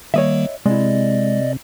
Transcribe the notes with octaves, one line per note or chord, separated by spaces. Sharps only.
D#3 G3 A#3 C#5 D#5 E5
C3 G#3 E4 D5 D#5